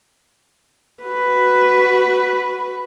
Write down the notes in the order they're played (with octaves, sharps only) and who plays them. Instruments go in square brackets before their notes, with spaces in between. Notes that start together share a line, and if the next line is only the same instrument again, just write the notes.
[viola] F#4 B4